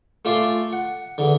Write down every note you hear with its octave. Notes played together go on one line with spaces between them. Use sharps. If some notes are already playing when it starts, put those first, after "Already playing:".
A3 F4 D5 G#5 C6
F#5
E2 D3